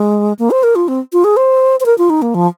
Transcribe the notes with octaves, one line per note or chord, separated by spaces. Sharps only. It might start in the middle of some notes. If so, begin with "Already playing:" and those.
Already playing: G#3
A#3
C5
A#4
F4
C4
F4
G#4
C5
C5
A#4
F4
D#4
A#3
F3